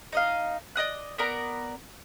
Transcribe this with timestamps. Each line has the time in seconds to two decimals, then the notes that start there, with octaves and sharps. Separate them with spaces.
0.13 D#4 D#5 F5
0.76 D5 D#5 D#6 F#6
1.18 B3 A#4 D5 A#5